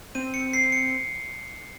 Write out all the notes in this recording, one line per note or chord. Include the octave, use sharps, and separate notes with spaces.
C4 D#7
C#7
C7
C#7